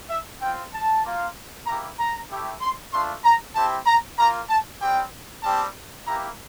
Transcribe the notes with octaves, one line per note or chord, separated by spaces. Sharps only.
E5
C4 F4 G5
A5
A#3 F4
A#3 E4 G4 A#5
A#5
A3 E4 G4
C6
A3 D4 F4 C6
A#5
C4 E4 G4 A5
A#5
A#3 F4 A#5
A5
G3 C4 G4 G5
G3 C4 G4 A5
A#3 E4 G4 A#5